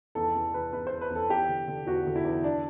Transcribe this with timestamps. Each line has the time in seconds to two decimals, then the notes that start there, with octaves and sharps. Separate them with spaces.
0.15 E2 A4
0.35 E2
0.54 E2 B4
0.73 E2 B4
0.87 C5
0.92 E2
1.01 B4
1.10 E2
1.15 A4
1.29 E2 G4
1.49 D3
1.68 D3
1.87 E2 F#4
2.07 D3
2.16 E4
2.25 E2
2.44 D4